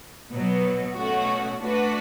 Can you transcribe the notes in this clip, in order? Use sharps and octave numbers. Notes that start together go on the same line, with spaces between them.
B2 F#3 B3
B2 A3 C#4 F#4
A3 D4 F#4 B4